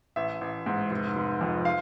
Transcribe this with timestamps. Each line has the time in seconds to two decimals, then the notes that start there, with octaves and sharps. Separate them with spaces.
0.16 A1 E5
0.41 A1
0.66 G#2
0.91 F1
1.16 F1
1.41 F2
1.65 F5